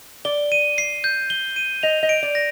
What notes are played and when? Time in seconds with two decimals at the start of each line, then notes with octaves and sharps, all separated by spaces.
0.25 D5 G7
0.52 D#7
0.78 C7
1.04 G6
1.30 G7
1.56 D#7
1.83 D#5 F7
2.03 D#5
2.09 D7
2.23 D5
2.35 A#6